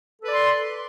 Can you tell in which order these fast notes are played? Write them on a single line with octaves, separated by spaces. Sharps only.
A4 B4 D5 C6